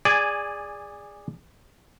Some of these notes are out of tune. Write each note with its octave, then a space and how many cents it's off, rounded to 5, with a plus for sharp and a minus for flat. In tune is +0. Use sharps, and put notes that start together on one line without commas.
G#4 -20 D5 +0 G#5 +0